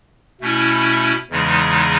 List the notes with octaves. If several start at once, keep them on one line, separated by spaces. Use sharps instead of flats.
B2 A3 C#4 E4
E2 C#3 E3 G#3 D#4